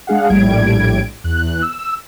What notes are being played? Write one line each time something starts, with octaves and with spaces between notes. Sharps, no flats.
G#3 D4 G#4 F5 F#5
A#1 A2 G3 G#6 D7
E2 F#6
E6